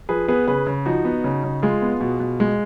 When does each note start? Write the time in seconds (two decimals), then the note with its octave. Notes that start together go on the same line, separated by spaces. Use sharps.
0.09 F3 G#4 B4
0.28 B3 G#4 B4
0.48 C#3 G#4 B4
0.67 C#3
0.86 F3 D#4 F#4
1.05 B3
1.24 C#3
1.44 C#3
1.62 G#3 F4 G#4
1.82 B3
2.01 B2
2.20 B2
2.40 G#3